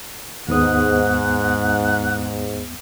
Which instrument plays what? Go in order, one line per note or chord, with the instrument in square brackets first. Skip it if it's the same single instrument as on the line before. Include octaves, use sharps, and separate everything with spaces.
[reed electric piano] D#2 B3 D#6 [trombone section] G#2 [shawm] F#5